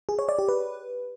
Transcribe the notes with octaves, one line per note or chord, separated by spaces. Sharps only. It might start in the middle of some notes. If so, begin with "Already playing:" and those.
G#4
C#5
D5
G4
B4